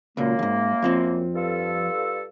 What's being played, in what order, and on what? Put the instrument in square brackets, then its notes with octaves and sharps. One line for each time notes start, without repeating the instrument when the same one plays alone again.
[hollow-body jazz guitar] C#2 A#2 [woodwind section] F#2 A#3
[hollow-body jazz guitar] D#2 G#2
F2 F3 C4
[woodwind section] G2 F4 A4